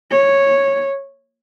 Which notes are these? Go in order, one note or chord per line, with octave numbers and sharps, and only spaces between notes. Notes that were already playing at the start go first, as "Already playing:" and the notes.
C#5